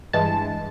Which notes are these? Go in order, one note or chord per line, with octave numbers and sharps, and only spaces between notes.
G2 E3 G#3 A5